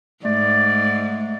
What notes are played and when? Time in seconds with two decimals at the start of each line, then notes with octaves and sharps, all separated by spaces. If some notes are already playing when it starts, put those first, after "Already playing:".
0.25 G#2 A3 D5